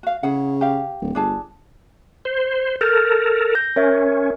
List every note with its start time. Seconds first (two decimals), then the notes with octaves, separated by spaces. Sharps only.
0.03 F#4 F5
0.23 C#3 E4 G#4 F#5
0.61 G4 F5
1.02 D1
1.15 G1 D4 G#4 A5
2.25 C5
2.81 A4 A#4 F6 G6 A6
3.55 G6 A#6
3.76 C#4 A#4 C#5 E5